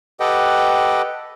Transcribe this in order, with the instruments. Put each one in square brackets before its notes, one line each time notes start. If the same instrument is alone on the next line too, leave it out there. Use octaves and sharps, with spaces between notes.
[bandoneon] G4 A4 B4 D#5 F#5 G5